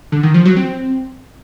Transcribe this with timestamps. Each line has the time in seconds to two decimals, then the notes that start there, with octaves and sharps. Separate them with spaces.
0.12 D3
0.23 D#3
0.34 F3
0.45 F#3
0.57 C4